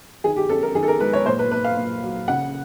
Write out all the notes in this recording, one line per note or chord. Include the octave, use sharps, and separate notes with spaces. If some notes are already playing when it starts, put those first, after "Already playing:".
D#3 G#4
G4
C#4 A4
A#4
D#3 G#4
A4
A#4
G#3 B4
C#5
A#2 C5
B4
A#3 B4
F5
A#2
F#3
C#3 F#5